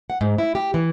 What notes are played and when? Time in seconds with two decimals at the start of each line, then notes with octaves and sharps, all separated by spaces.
0.10 F#5
0.21 G#2
0.38 E4
0.55 G4
0.74 E3